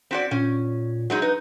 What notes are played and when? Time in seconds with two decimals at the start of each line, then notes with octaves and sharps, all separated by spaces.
0.11 C4 F#4 D5 B6
0.31 A#2 C#4
1.10 F#3 G#3 D#4
1.22 D#4 B4